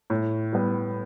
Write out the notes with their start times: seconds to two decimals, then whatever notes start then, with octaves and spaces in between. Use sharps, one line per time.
0.10 A2
0.53 G3 B3